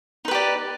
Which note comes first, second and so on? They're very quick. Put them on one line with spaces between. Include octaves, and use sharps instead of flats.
D#4 B4 G4 D5